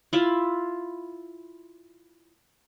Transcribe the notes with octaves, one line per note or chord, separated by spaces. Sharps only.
E4 F4 E5